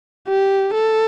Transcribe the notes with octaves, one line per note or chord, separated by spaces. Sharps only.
G4
A4